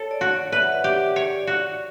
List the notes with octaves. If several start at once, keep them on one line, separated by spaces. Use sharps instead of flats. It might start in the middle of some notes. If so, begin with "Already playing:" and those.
Already playing: A4 C#5
D5
F#4
D5
B4 E5
F#5
E5
G4
C#5 D5
F#4